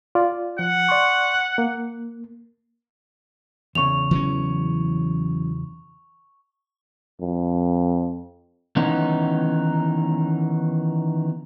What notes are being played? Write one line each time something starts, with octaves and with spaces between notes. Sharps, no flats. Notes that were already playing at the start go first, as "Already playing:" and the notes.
F4 D5
F3 F#5
D5 C6 C#6
A#3
E2 C#3 C#6 F7
E3 F#3 C#4
F2
D#3 E3 B3 C#4 D#4